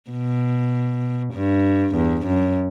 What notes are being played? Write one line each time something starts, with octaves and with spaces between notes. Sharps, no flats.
B2
G2
E2
F#2